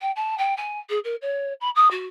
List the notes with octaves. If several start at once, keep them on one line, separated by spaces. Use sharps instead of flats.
G5
A5
G5
G#5
G#4
A#4
C#5
B5
D#6
F#4